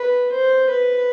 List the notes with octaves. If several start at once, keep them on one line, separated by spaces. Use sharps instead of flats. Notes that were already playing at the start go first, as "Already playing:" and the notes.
Already playing: B4
C5
B4